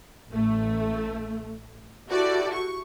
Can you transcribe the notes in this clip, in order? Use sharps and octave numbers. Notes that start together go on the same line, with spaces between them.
A1 A3
E4 F#4 G4 A4 D5
C#6